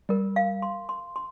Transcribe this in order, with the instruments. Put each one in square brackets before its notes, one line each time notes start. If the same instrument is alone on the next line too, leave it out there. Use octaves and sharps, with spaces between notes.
[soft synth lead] G3 [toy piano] A#4
[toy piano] F5
C6
C6
C6